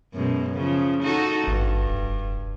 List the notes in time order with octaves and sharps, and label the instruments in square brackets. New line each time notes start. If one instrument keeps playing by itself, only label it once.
[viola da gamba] F#2 B2 G#3
C#3 F3
D#4 F#4 A4
[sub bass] G#1 [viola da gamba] G2
[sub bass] F1